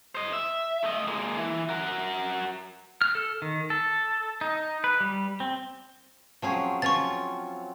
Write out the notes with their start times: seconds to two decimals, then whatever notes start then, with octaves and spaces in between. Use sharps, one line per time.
0.15 C5 D#5
0.33 E5
0.84 A3 D#5
1.07 G#3 A#3
1.37 E3
1.69 F#4 A#4
3.02 F6
3.15 A4
3.42 D#3
3.70 A4
4.41 D#4
4.84 B4
5.00 G3
5.40 C4
6.42 F3 F#3 C4 C#4 G#4
6.82 F3 C#4 F4 C#6 A6